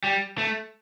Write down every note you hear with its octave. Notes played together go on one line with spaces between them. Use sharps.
G3
A3